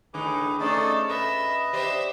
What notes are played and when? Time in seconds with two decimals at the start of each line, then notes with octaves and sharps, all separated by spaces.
0.14 A2 D3 D#4 G#4 B4 D6
0.60 A3 C#4 D#4 G#4 A4 C5 D5
1.09 A#2 B4 D#5 E5
1.73 G4 C5 D5 E5